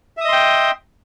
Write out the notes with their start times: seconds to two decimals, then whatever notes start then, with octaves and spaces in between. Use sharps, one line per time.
0.17 E5
0.21 D#6
0.25 D#5
0.29 C6
0.32 G5